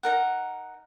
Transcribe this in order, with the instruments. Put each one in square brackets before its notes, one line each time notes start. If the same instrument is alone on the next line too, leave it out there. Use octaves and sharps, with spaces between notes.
[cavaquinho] D#4 A#4 F#5